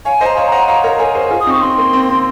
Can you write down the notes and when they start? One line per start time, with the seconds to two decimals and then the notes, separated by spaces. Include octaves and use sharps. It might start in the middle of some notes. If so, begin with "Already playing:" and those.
0.05 C#5 F5 G#5
0.21 C5 D#5
0.26 A#5
0.37 C#5 F5
0.47 D#5 F#5 A#5
0.68 C#5 F5 A#5
0.84 A#4 C#5
0.99 A#4 C#5 G#5
1.15 G#4 C5
1.31 F4 G#4
1.41 D#6
1.47 C4 D#4
1.51 C#6
1.62 C4 C6
1.78 A#3
1.93 C4
2.09 C4